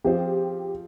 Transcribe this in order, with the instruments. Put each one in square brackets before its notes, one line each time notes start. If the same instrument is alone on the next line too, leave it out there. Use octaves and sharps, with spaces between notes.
[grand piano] F3 C4 F4 G#4 C5 [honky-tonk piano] G4